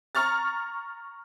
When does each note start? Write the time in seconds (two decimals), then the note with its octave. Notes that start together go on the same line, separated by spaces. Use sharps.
0.15 A#5 C#6 F6 A6